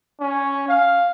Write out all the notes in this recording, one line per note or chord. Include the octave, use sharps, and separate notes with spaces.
C#4
F5